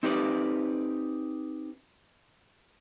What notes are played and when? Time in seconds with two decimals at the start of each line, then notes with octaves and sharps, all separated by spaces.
0.03 C4 D#4 G4 B4 D5